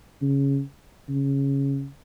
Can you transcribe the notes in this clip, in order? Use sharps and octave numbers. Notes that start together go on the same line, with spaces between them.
C#3
C#3